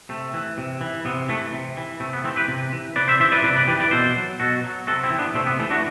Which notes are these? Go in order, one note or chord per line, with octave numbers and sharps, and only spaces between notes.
C3 A3
E3
C3
E3
C3 B3
E3 A3
C3
E3
C3 A3
B3
E3 A3 C4
G4 B4
C3
E3
C3 B4 D5
C5 E5
E3 C5 E5
B4 D5
C3 B4 D5
B4 D5
E3 G4 B4
B4 D5
B2 A4 C5
F#3
B2 F#4 A4
F#3
C3 F#4 A4
C4 E4
E3
B3 D4
C3 A3 C4
B3
E3 A3
D4 F#4